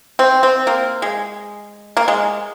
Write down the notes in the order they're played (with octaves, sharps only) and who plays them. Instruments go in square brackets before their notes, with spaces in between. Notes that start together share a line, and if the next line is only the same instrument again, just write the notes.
[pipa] C4
C4
A#3
G#3
A#3
G#3